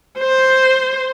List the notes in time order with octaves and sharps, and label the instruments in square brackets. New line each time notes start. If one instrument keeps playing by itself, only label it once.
[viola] C5